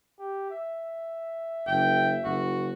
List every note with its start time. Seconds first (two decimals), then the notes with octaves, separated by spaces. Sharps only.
0.19 G4
0.51 E5
1.67 F#1 G5
2.25 F#1 F#4